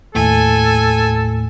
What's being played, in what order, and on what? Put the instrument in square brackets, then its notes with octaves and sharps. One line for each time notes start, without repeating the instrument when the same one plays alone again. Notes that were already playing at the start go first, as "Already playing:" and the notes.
[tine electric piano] D#2 A2 A3 [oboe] A4 [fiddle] G#5